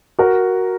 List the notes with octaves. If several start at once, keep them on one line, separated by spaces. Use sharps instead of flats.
F#4 A#4